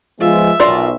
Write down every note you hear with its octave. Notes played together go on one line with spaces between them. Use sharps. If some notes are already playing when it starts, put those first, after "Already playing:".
F3 G#3 B3 F4 E5
B1 F4 A#4 D5 C6